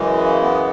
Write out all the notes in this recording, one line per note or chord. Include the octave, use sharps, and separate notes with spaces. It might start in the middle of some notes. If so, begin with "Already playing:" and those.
Already playing: F#2 C#3 E3 G#3
B3